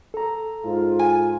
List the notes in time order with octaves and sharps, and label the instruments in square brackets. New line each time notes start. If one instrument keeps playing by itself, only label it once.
[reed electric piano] A4 A#5
[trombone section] G#2 F4
[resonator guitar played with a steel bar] G#5